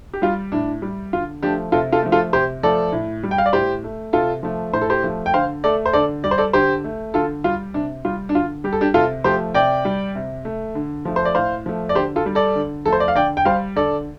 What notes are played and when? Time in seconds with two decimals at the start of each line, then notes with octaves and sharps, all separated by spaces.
0.14 G4
0.22 G3 F4
0.52 A2 D4
0.82 G3
1.13 D3 F4
1.42 F3 A3 D4 G4
1.72 C3 F4 A4
1.92 F4 A4
2.03 F3 A3
2.12 F4 A4
2.33 C3 G4 C5
2.63 F3 A3 A4 D5
2.92 A2
3.23 G3
3.31 G5
3.38 F5
3.46 D5
3.53 A2 G4 C5
3.84 A3
4.13 C3 F4 A4
4.43 F3 A3
4.73 A2 C5
4.81 A4
4.90 G4 C5
5.03 F3 A3
5.26 G5
5.34 D3 C5 F5
5.64 A3 A4 D5
5.86 C5
5.93 D3 A4 D5
6.24 G3 D5
6.31 C5
6.38 A4 D5
6.53 D3 G4 C5
6.84 A3
7.14 D3 F4 A4
7.44 G3 F4
7.74 C3 D4
8.05 G3 F4
8.29 D4
8.35 D3 F4
8.64 G3 G4
8.73 A4
8.81 D4 G4
8.94 C3 F4 A4
9.24 F3 A3 G4 C5
9.54 C3 D5 G5
9.85 G3
10.15 C3
10.45 A3
10.75 D3
11.05 F3 A3
11.16 C5
11.25 D5
11.35 A2 C5 F5
11.66 F3 A3
11.89 D5
11.95 D3 G4 C5
12.16 F4 A4
12.26 G3
12.35 A4 D5
12.55 D3
12.86 F3 A3 A4
12.93 C5
13.00 D5
13.08 F5
13.15 D3 D5 G5
13.37 G5
13.45 G3 C5 F5
13.76 D3 A4 D5